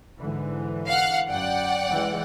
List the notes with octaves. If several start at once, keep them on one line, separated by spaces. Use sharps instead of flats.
G#2 D3 E3
F5 F#5 F6
F#2 D5 F#5 G5
E3 G#3